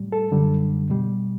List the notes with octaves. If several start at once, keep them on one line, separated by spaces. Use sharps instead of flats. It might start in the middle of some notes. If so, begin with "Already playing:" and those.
Already playing: A2 G3
A4
F#2 D3 G3
B2 G3